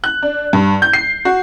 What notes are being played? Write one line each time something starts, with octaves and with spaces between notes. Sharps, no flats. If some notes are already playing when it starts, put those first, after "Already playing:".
F#6
D4
G2
G6
C7
F#4